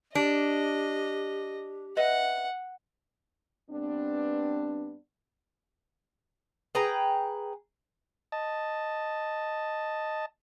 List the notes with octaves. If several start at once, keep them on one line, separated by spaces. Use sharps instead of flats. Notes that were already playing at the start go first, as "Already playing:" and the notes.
D4 G4 D#5
B4 D#5 E5 F#5
G2 B3 C4 D4
G#4 B4 G5 A#5
D#5 A5